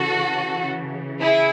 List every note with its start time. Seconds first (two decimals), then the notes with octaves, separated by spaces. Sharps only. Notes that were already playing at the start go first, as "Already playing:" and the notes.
Already playing: C#3 E3 F#4 A4
1.21 E4 G#4